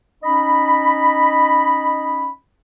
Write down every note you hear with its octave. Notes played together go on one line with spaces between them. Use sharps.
C#4 D#4 D#5 B5